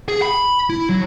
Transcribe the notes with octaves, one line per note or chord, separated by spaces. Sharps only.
G#4
B5
E4
F#3